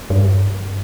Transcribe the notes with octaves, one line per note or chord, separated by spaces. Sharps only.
G2